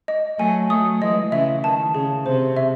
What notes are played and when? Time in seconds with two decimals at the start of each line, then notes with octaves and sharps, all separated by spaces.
0.08 D#5
0.38 F#3 A3 G#5
0.70 F#3 A3 D#6
1.01 E3 G#3 D#5
1.32 C#3 E3 E5
1.64 D#3 A5
1.95 C#3 G#4
2.25 C3 C5
2.57 E5